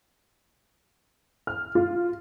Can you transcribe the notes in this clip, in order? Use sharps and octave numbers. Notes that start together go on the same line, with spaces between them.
F6
F4